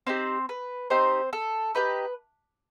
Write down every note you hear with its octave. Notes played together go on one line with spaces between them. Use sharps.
C4 D#4 G4 C5
B4
C4 D#4 G4 C5
A4
D#4 G4 B4